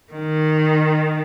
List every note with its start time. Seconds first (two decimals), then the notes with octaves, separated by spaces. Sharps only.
0.12 D#3